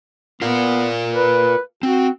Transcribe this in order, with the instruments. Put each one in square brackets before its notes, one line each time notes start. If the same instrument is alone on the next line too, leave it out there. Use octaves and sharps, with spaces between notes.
[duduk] B3 [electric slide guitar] F4 A#4 F5
[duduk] B4
[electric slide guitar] C4 [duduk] F#4